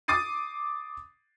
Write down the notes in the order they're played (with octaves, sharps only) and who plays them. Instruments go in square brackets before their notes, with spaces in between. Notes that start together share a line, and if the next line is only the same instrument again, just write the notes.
[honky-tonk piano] D6 D#6 A6 C7 D#7